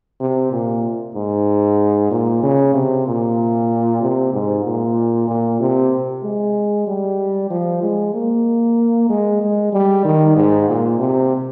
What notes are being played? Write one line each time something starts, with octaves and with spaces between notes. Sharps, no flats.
C3
A#2
G#2
A#2
C#3
C3
A#2
C3
G#2
A#2
A#2
C3
G#3
G3
F3
G#3
A#3
G#3
G#3
G3
D#3
G#2
A#2
C3